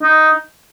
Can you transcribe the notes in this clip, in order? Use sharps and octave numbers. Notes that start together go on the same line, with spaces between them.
D#4